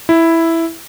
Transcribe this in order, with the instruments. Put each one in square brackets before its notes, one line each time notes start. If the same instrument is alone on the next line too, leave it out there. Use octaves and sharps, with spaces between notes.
[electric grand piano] E4